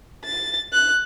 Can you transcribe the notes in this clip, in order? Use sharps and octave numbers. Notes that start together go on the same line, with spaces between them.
A6
F#6